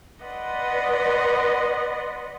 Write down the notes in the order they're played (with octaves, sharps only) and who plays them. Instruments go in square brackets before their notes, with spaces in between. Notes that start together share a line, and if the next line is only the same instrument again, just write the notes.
[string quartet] B4 D5 D#5 F#5 C6